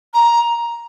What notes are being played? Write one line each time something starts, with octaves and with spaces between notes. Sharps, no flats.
A#5